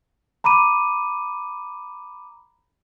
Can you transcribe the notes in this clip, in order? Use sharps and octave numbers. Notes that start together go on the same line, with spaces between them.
A#5 B5 D6 D#7